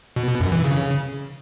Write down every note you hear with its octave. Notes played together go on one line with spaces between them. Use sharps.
B2
B2
F#2
E3
C#3